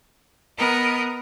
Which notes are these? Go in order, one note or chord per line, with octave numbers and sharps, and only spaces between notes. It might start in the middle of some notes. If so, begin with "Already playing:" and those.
B3 A#4 B4 D#5 A#5